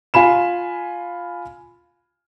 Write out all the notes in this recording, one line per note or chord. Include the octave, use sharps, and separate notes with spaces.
F4 G#5 B5 E7